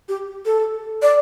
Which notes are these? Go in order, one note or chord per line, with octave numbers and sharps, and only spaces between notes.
G4
A4
D5